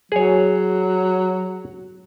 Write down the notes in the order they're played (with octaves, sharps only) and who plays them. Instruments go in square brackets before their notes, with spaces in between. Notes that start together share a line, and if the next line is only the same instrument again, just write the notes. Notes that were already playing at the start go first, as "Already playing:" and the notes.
[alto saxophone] F#3 [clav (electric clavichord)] G#4 C#5